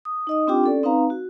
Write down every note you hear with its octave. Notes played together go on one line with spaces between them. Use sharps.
D#6
D#4 D#5 D#6
C4 D4 F4 G4 G5 D6
C#4 A4 D5
C4 D#4 B4 F5 A#5
F#4